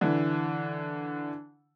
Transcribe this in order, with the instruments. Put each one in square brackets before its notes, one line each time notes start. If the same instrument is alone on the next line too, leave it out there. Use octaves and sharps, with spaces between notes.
[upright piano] D3 E3